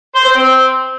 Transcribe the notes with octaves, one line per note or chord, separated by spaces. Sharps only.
C5
C5
C4